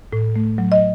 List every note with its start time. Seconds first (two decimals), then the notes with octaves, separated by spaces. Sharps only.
0.13 A2
0.36 A3
0.58 F#3
0.72 D#5